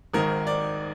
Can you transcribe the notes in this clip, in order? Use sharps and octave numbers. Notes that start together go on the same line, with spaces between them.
G#1 G#2 D#3 A#4
D5